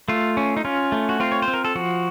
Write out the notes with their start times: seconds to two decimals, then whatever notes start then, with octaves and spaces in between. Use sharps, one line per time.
0.08 A3 F4
0.37 C#4
0.57 D#4
0.65 C#4 F4
0.92 A3
1.09 F#4
1.20 C4 F4
1.32 C#5
1.42 C5
1.48 C4
1.54 A#4
1.65 A4
1.75 F3 F#4